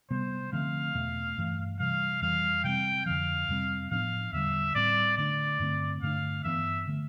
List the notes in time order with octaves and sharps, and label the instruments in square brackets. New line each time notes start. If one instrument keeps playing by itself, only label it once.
[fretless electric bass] C3 G3 B3 [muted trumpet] C5
[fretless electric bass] D3 F3 A3 C4 [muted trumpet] F5
[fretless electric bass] E2 B2 A3
G2 E3 A3
[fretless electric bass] C3 E3 G3 [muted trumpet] F5
[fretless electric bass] F2 E3 G3 [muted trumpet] F5
[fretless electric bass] C3 G3 C4 [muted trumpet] G5
[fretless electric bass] F2 D3 F3 [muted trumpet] F5
[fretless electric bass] F2 C3 G3 C4
[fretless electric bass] A2 F3 B3 D4 [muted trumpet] F5
[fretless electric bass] E2 D3 G3 [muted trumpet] E5
[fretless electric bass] A2 G3 C4 [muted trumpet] D5
[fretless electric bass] D3 A3 D4 [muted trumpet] D5
[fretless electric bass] G2 D3 A3 C4
[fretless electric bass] G2 D3 A3 D4 [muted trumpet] F5
[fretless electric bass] G2 E3 B3 [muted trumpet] E5
[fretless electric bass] D3 A3